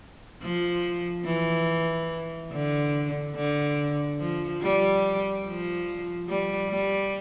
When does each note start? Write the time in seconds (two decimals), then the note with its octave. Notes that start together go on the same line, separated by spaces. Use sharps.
0.42 F3
1.26 E3
2.52 D3
3.35 D3
4.20 F3
4.61 G3
5.46 F3
6.28 G3
6.70 G3